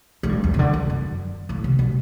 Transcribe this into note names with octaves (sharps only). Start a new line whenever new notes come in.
A2
G2
E2
C3
D3
E2
F#2
A2
C3
B2